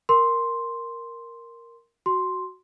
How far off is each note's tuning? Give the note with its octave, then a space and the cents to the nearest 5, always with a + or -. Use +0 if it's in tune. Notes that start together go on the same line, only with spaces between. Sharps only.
A#4 +0 C6 +0
F#4 +0 C6 +0